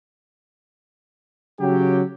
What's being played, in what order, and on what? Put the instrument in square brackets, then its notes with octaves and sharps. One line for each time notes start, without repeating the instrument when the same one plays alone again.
[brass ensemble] C#3 F#3 G4